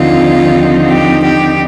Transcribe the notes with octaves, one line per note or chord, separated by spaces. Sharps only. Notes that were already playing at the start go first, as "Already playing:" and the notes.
Already playing: D#2 D3 F3 C4 D#4 F4
G4
G4